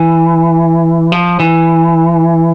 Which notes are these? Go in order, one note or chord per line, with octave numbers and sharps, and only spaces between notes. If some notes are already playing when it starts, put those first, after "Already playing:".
Already playing: E3
F3
E3